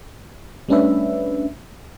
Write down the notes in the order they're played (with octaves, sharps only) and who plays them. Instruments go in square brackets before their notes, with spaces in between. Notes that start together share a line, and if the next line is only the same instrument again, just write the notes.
[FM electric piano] G3 A3 C#4 D4 B4 E5